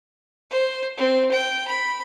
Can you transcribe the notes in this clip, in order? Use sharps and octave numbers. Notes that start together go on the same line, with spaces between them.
C5
C4
G5
B5